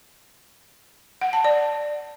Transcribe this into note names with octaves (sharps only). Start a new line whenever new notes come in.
F#5
A5
D5